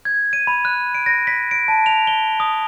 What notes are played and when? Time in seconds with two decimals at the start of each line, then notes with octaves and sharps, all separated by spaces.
0.05 G#6
0.33 D#7
0.47 B5
0.65 F#6
0.95 D7
1.06 A#6
1.27 B6
1.51 D7
1.68 A5
1.86 F7
2.07 G7
2.40 D#6